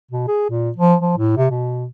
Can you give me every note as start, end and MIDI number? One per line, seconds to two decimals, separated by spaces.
0.11 0.26 47
0.28 0.45 68
0.50 0.70 46
0.77 0.95 53
1.01 1.16 53
1.18 1.33 45
1.37 1.50 48
1.50 1.86 47